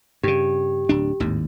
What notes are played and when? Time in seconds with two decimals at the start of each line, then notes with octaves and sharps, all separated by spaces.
0.23 G2 C#3 G4
0.89 D1 D4
1.20 G#1 D#2 A2